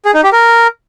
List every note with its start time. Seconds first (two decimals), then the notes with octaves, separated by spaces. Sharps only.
0.05 G#4
0.14 D#4
0.23 G4
0.33 A#4